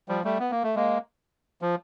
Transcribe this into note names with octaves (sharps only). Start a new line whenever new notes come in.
F3 G3
G3 A3
B3
A#3
A3
G#3 A#3
F3